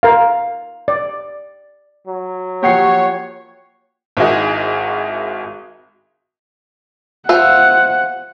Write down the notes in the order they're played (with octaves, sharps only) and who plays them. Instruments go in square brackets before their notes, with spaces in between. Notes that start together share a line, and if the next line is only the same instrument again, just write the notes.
[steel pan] A#4 F5
D5
[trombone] F#3
[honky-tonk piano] F3 G4 [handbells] A#3 F#5 C7 [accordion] C#5
[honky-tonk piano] G#1 D#3 E4 F#4 G#4 D#5
[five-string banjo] F4 C5 E5 [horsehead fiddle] F#5